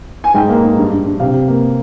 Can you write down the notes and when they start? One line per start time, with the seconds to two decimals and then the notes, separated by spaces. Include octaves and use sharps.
0.24 G#5
0.34 G#2 G5
0.49 A#3
0.63 G#2
0.77 G2
0.92 G2
1.06 G2
1.20 C3 F5
1.34 C3
1.48 A#3